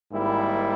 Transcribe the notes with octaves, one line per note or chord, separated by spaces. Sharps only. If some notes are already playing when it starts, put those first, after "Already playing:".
G#1 G#2 G3 A#3 E4